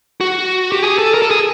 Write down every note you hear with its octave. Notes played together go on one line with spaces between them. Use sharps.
F#4
G4
G#4
A4
A#4
A4
G#4